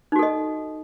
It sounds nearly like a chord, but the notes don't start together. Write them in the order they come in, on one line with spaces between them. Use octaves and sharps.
D#4 F#4 A4 D#5